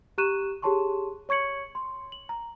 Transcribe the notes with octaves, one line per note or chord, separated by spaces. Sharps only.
G4 A#5 C#6 F#6 D#7 E7
G4 G#4 C#5 A5 C6 C#6
C#5 C#6 G#6 C#7 F#7
C6
F#7
A#5